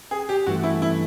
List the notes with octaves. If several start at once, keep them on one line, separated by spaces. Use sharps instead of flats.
G#4
G4
G2 E3 A3 F#4
E4
E4